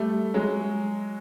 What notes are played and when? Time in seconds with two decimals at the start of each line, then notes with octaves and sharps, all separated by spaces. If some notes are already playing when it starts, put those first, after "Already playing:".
Already playing: G3 A3
0.34 F#3 G#3